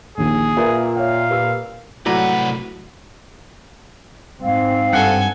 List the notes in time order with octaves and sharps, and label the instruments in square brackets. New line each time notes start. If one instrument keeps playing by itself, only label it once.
[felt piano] A#1 D#2 [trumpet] G#4
[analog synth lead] A#2 [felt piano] A#4 B4 E5
[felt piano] C#5 E5 G5 [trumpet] F5
[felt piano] G4 B4 E6
[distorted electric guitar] C2 B4 [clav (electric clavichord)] A2 D5 A#5 [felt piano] F#3 [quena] F#5
[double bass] G#2 C4 [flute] F5
[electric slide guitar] G2 F#5 [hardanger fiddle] A4 G#5